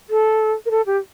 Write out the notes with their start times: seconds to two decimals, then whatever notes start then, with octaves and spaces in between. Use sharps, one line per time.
0.10 A4
0.66 A#4
0.71 A4
0.86 G4